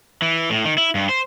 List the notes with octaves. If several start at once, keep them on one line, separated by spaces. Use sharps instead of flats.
E3
A2
D#3
E4
G2
C5